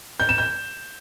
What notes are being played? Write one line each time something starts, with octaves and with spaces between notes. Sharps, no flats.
G6
E7
G6